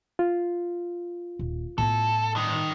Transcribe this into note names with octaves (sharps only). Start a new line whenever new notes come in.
F4
D#1
A2 B3 A4
G2 D#3